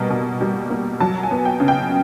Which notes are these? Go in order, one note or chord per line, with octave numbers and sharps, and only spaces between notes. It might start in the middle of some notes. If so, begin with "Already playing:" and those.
Already playing: B2 G3 A#3
B2
G3
A#3
F#3 A5
G#5
B3
G5
C#3
G5